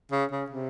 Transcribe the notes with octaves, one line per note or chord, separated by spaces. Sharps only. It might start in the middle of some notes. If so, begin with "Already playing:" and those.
C#3
C#3
C3